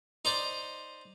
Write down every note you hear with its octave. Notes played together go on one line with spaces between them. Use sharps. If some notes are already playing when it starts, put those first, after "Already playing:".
D#4 C5 D5